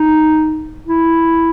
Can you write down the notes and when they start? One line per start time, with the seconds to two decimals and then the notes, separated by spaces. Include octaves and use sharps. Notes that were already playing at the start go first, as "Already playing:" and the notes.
Already playing: D#4
0.87 E4